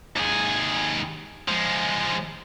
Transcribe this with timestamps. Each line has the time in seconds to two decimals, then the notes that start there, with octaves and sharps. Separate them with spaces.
0.16 D#2 G#4
1.48 F3 G#3